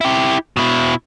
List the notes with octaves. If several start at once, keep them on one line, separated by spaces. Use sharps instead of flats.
E4 G4
B2 E4